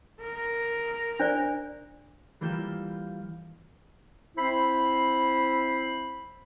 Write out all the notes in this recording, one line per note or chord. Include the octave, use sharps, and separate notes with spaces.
A#4
D4 C5 D5
E3 G3 A#3 F4 G6 E7
C4 E4 C5 B5